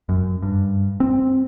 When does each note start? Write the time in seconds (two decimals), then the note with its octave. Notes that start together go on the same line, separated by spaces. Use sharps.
0.09 F#2
0.42 G2
1.00 C4